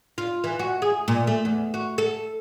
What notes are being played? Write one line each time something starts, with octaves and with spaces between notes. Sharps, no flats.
F4
E3
F#4
G#4
A#2
A3
E2
F#4
A4